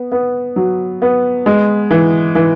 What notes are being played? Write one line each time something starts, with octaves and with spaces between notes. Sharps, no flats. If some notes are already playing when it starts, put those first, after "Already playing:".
Already playing: B3
B3
F#3
B3
G#3
E3
E3